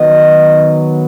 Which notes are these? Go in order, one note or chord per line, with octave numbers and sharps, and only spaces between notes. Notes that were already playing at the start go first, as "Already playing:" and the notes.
Already playing: D#3 F#3 B3 D#5